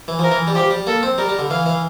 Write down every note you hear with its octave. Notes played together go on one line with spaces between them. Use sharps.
E3
F3 A#4
E3
G3
F3 G4
G3
A#3 A4
C4
G3 A#4
G3
D3
E3 F5
E3